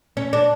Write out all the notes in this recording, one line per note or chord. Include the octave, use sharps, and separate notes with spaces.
C#4
D4